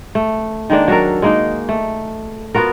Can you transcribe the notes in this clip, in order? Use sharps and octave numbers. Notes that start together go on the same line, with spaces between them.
A3
D#3 G#3 A#3 D4
F#3 F#4 A4 A#4
G#3 A#3 D#4
A3
B3 F4 F#4 A#4